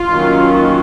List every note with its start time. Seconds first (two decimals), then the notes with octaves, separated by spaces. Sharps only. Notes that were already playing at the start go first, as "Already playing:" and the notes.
Already playing: F4
0.10 D#3 F#3 A#3 C#4